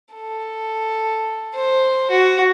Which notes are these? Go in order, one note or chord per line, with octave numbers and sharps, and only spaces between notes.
A4
C5
F#4